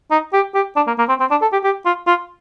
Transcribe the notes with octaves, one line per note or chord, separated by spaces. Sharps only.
D#4
G4
G4
D4
A#3
A#3
C4
C4
D4
A4
G4
G4
F4
F4